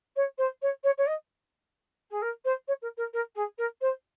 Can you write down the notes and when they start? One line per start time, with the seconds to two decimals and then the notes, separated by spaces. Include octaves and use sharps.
0.16 C#5
0.38 C5
0.62 C#5
0.84 C#5
0.98 C#5
1.07 D#5
2.10 G#4
2.22 A#4
2.45 C5
2.68 C#5
2.82 A#4
2.97 A#4
3.13 A#4
3.35 G#4
3.58 A#4
3.81 C5